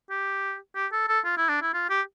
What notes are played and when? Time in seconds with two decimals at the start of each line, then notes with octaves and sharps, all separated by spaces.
0.10 G4
0.76 G4
0.92 A4
1.08 A4
1.25 F4
1.38 E4
1.49 D4
1.62 E4
1.74 F4
1.90 G4